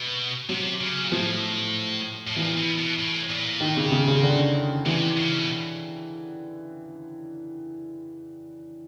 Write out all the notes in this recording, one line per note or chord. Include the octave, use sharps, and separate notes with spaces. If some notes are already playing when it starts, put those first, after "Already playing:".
Already playing: B2
C3 F#3
C#3
A#2
A2 F3
A2
A#2 E3
B2
B2
A2
A#2
D#3
C#3
C#3
C#3
D3
C3 E3
C#3
B2